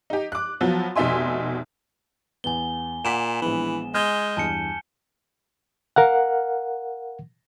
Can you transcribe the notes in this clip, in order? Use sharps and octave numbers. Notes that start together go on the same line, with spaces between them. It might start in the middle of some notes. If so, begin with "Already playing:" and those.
D#4 G4
D6 F#6
F3 F#3 B3
F1 B2 D#4 E5 G#5 C6
E2 B3 G#5 G7
A#2 F#5 D6 B6 E7
A#1 E3 G#3 B3
G#3 F6 G6 G#6 G7
E2 G2 G#5 A5 C#7
A#4 F5 F#5